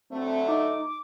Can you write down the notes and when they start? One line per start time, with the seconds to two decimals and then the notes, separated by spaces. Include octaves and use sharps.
0.11 D3 F#3 A3 C4
0.48 D#4 D#5 D6